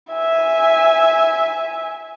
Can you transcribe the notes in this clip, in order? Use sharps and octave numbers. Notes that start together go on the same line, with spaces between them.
E5 G#5